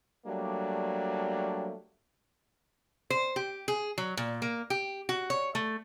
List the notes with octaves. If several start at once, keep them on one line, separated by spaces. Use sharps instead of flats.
F#3 G3 A3 A#3 D4
C5
G4
G#4
F#3
A#2
A#3
G4
F#4
C#5
A3